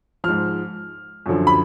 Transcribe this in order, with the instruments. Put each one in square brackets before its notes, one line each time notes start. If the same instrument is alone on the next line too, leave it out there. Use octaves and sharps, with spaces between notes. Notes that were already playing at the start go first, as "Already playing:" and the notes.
[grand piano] G#2 F3 F6
F#2 D3 F3
B5